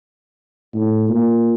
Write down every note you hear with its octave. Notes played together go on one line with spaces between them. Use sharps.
A2
A#2